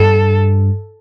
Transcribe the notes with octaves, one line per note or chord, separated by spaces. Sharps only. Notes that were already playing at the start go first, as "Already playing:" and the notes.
Already playing: G2 A4